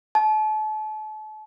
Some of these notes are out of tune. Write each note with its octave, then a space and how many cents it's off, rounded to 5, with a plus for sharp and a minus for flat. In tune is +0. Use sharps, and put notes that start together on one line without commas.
A5 -35